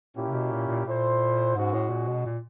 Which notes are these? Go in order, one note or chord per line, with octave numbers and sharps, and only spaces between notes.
A#2 A#3 C#4 E4 G4
C3
B2
A#2
A#2
A#2 E4 A4 C5
G#2 G#3 C#4 F#4
A2
A#2
B2
A#2